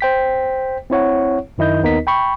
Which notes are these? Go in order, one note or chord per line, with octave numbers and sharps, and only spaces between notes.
C5 G5 B6
C4 E4 C#5 F#5
F#2 D#3 E4 D#5 G6
D#2 B3 D#4 A#4 D#5 B6
G5 B5 C#6